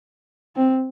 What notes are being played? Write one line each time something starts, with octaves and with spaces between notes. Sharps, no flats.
C4